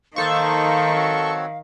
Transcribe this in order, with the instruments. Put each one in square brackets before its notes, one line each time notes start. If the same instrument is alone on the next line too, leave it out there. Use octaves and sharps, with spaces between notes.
[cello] D#3 [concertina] A#3 D#4 C5 [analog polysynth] A4 C#6 [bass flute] F5
[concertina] C4 F#4 C#5